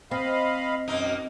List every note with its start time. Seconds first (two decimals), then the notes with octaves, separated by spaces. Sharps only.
0.11 C4 D#5 F5 B5
0.88 F#2 B2 A#3 D#4